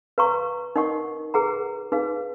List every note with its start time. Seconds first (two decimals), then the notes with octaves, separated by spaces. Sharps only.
0.18 B4 F5 A#5 C#6
0.76 D#4 A#4 D#5 F#5 C#6
1.34 G#4 B4 F#5 A#5
1.92 D#4 G#4 B4 F5